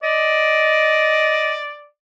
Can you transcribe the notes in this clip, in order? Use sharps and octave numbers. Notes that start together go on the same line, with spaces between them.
D5 D#5